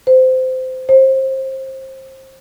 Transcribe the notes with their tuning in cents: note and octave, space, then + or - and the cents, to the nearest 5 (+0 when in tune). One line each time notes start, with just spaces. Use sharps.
C5 -20
C5 +25